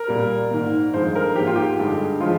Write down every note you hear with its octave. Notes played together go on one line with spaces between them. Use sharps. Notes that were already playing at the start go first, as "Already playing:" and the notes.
Already playing: A#4
A#2 G3 A#3
G#2 D#3 A#3
G2 F3 G#3 C5
A#4
G#2 F3 A#3 G4
F4
G4
G2 D3 G#3
F3 G#3 F4